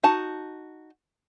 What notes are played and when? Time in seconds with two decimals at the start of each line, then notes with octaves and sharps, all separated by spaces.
0.03 D#4 F#4 A5